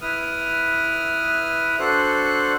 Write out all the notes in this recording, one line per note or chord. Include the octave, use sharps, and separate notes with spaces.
E4 B4 D#6 F6
D4 F#4 A4 C5 F#6